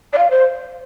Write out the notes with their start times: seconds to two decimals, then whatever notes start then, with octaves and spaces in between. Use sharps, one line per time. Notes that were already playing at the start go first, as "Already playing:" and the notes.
0.13 D5
0.18 F5
0.31 C5